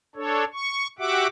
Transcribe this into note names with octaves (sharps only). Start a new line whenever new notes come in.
D4 A4 C#5
C#6
F#4 G4 E5 F#5 D6